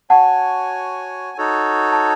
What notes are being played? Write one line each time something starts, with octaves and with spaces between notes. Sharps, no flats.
F#4 C#5 F#5 G#5 A5
D#4 F#4 A4 C#5
A5